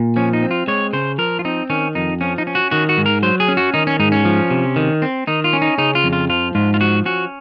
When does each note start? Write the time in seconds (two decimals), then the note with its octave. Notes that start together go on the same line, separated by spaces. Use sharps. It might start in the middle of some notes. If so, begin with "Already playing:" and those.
Already playing: A#2
0.16 F3 C#4
0.33 D#4
0.42 C4
0.51 F4
0.67 G#3 C#5
0.93 C#3 C5
1.18 F3 A#4
1.39 F4
1.45 C4 D#4
1.70 D#3 C#4
1.95 F2 D#4
2.21 F3 C#4
2.38 D#4
2.47 C#4
2.55 F#4
2.71 D#3 F#4
2.89 F#4
2.98 G#2
3.06 A#4
3.23 F#3 C5
3.40 G#4
3.48 C#4
3.57 F#4
3.74 D#3 D#4
3.87 C#4
4.00 G#2 D#4
4.12 C#4
4.25 F3
4.51 C3
4.76 D#3
5.02 C4
5.27 D#3 D#4
5.44 F4
5.53 C#4
5.62 D#4
5.78 C#3 D#4
5.95 F4
6.04 F2
6.13 F4
6.30 F3 F4
6.55 G#2 F4
6.74 F4
6.80 F3 F#4
7.06 C#4 F#4